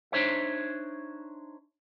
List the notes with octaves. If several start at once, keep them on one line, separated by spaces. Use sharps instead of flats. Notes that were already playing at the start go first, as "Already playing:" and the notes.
D4 D#4 C5 C#5 E5